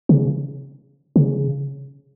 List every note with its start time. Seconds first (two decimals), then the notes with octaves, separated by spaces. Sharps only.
0.09 C#3
1.16 C#3